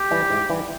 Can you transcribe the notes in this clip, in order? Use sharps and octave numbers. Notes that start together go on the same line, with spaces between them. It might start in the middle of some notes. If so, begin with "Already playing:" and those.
Already playing: G4
E3 G3
G#2
E3 G3